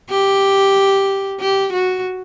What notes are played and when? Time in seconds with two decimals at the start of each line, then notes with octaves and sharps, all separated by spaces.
0.10 G4
1.40 G4
1.72 F#4